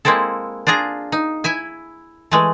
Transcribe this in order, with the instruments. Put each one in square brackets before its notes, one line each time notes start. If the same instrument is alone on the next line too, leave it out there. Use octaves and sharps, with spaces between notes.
[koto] G#3 A#3 C4 E4 A4
D4 F4 G#4 A#5
D#4
E4 E5 G#5
E3 G#3 A3